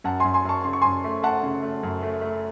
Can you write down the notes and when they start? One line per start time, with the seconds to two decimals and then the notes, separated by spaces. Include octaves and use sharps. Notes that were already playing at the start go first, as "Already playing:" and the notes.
0.04 F#2 F#5 A5
0.20 F#2 G#5 C6
0.34 G#5 C6
0.45 F#2 A5 C#6
0.64 C#3 C6
0.73 C#6
0.82 F#2 G#5 C6
1.04 A3
1.23 A3 F#5 A5
1.43 C#3
1.62 A3
1.83 F#2
2.02 A3
2.21 A3